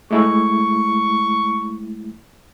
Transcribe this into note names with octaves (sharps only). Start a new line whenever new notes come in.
G#3 A3 E4 C#6